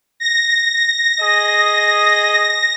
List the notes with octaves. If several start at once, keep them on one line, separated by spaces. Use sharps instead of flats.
A#6
G#4 D#5 D#6